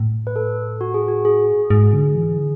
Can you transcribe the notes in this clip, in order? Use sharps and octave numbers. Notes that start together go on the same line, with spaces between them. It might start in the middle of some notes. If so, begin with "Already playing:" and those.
Already playing: A2
B4
A4
F#4
G#4
F#4
G#4
G#2 G#4
D3
E3
D3